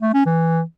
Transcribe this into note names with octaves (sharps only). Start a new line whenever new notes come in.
A3
C#4
E3